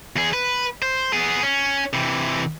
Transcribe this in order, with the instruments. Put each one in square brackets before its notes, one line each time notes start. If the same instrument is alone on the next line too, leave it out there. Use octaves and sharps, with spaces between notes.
[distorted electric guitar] E2 G#4
B4
C5
B3 G#4
C#4
C3 E3